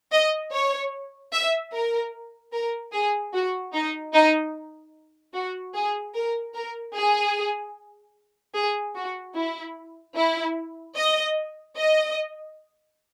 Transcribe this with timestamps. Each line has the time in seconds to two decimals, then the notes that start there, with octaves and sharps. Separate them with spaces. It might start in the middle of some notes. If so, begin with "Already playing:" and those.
0.12 D#5
0.52 C#5
1.33 E5
1.73 A#4
2.53 A#4
2.93 G#4
3.33 F#4
3.73 D#4
4.13 D#4
5.34 F#4
5.74 G#4
6.14 A#4
6.54 A#4
6.95 G#4
8.55 G#4
8.95 F#4
9.35 E4
10.15 E4
10.96 D#5
11.76 D#5